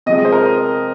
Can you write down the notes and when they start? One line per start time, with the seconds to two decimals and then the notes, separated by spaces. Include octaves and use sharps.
0.06 C3 F3 G#3 D#5
0.25 C5
0.32 A#4